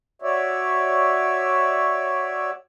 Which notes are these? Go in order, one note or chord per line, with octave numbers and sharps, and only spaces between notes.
F#4 C#5 D5 E5